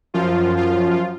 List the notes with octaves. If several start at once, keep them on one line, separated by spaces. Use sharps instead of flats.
F#2 F3 F4
F4